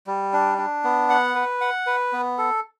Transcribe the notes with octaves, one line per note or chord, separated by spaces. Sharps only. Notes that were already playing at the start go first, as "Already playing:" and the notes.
G3
D4
D4
B3
F#5
B4
F#5
B4
B3
A4